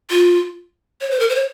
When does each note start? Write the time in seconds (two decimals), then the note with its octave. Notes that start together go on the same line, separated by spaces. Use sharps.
0.10 F4
1.01 C#5
1.11 C5
1.19 A#4
1.29 C5
1.35 C#5